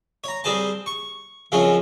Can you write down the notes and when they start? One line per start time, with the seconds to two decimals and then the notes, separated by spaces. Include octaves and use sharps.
0.24 C#5 A#5
0.44 G3 C4 G#4 C5 A5
0.86 C#6
1.52 F#2 C#3 F3 G#3 C4 C#4